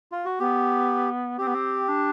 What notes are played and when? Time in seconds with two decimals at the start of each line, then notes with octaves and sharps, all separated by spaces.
0.12 F4
0.25 F#4
0.39 B3 G4
1.38 C4 G4
1.47 B3
1.54 C4
1.88 D4